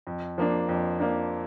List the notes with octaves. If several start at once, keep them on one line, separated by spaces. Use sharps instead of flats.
F2
F3 A#3 D4
F2
F3 A#3 D4